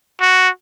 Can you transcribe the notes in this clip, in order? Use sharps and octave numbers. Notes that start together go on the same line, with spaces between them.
F#4